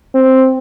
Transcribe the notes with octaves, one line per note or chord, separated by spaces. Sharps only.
C4